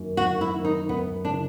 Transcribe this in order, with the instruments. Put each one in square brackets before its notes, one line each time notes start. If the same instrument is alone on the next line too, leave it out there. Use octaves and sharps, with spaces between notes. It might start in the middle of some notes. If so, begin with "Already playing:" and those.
Already playing: [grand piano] F#2 D#3 F#3 A#3
[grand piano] F#2 [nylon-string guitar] F#4
[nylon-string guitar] E4
[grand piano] D#3 F#3 A#3
[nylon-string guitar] D#4
[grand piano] F#2 [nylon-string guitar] B3
[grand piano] C#3 E3 [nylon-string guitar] D4